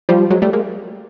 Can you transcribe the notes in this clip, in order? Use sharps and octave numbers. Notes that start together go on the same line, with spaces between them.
F3 G3
F#3 G#3
G3 A3
G#3 A#3